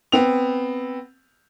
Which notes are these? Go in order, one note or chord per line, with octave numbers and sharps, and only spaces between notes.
B3 C4 F7